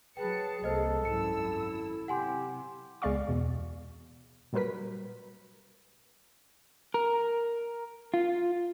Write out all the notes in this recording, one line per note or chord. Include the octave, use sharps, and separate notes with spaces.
F#3 G#4 B4 G5 A5 C#7
C2 A#3 A4 C5 D#5
G#1 F#2 E4 E6 C#7
C3 G4 F#5 G#5 C6
C#2 G#3 B3 D5 F5 C#6
E2 B2
A#2 F#3 G3 A#4 B4 B6
A#4
F4